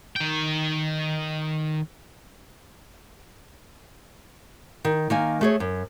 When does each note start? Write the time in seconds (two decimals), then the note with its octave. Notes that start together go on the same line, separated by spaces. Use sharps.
0.16 D#3 G5
4.85 D#3
5.10 D#3 A#3 G#5
5.41 A3 G#4 C#5
5.60 F#2